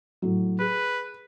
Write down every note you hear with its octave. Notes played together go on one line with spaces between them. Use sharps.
A2 F#3
G#4 B4